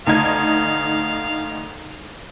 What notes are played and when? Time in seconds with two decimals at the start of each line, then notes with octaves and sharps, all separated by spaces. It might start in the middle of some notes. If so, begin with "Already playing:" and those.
0.07 D2 D#4 F5 G#6